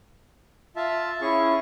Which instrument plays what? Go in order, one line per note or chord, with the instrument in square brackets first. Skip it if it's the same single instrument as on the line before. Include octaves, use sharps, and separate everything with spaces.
[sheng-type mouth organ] F4 E5 A5
[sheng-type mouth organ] C#4 G#4 C#6 [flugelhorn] E4